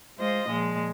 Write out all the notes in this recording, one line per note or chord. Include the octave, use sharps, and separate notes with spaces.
G#3 F4 C5 D#5
A#2 F3 G#3